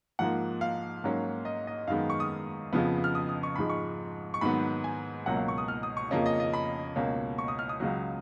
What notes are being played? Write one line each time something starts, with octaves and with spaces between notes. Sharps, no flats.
G#2 F3 A#3 F#5
F5
G#2 F#3 A#3 C#4
D#5
D#5
F#2 D#3 G#3 B3 F5
C#6
D#6
F2 C#3 F3 B3
F6
D#6
D#6
C#6
G#2 F3 G#3 B5
C#6
C#6
G#2 D#3 F#3 B3 B5
G#5
C#2 B2 F#3 A#3 C#4 F#5
F5
C#6
D#6
F6
D#6
C#6
F2 C#3 F3 A#3 C#4 D#5
D#5
D#5
B5
C#2 B2 A#3 C#4
C#6
D#6
F6
D#6
C#2 C#3 F#3